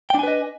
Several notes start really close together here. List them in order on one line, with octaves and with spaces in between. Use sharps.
G5 D4 G#5 B4 D#5